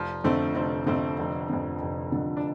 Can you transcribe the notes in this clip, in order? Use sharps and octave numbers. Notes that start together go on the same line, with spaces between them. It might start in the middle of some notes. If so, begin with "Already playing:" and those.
Already playing: F1 F3
F2 D3 A3 C4
F1 A3 C4
F2 D3 A3 C4
F1
F2 D3
F1
F2 D3
D4